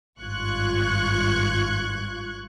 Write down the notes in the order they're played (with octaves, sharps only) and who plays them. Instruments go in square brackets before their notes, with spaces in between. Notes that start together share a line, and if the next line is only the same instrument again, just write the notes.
[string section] G#1 G2 F4 C#6 F#6 G#6